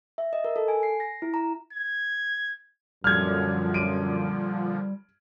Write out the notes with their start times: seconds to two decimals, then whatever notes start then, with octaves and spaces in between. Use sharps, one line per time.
0.18 E5
0.33 D#5
0.44 A#4
0.56 A4
0.68 G#5
0.83 C7
1.00 A#6
1.22 E4
1.34 A#5
1.73 G#6
3.04 F#2 A#2 D3 F3 G3 F6 G#6
3.74 D7 D#7